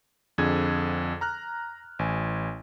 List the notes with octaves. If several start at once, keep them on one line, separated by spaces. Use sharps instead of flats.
F2 D3 G#4 G#6
A#5 F6 F#6
A1 G#5